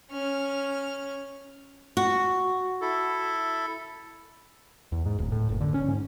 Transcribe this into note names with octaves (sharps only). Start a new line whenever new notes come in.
C#4 F6
F#4
E4 A4
E2
G#2
D1
A2
F#1
D3
C#4
G#2